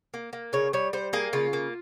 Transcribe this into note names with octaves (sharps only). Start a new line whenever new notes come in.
A#3
A#3
C#3 C#5
G3 C#5
G3 C5
A#3 G#4
C#3 F4
A#3